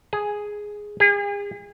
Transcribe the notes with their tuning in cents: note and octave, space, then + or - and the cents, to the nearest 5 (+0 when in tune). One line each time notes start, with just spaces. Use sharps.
G#4 +0
G#4 -40